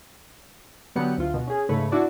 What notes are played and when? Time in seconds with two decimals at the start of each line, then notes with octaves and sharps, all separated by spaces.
0.95 D3 F#3 B3 G4 F#5 C#7
1.18 D2 F4
1.34 B2
1.47 C#4 G#4
1.69 G#2 C#3 A3 B4 C#5
1.92 D4 E4 F#4 D5